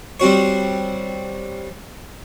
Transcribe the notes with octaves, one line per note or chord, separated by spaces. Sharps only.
G3 C4 F#4 C#5